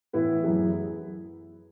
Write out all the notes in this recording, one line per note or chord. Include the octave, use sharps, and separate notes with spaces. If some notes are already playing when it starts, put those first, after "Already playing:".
A2 E3 B3 E4 B4
F#2 E3 B3 E4 G#4